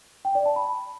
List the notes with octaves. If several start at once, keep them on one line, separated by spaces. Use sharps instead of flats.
G5
D5
A5
B5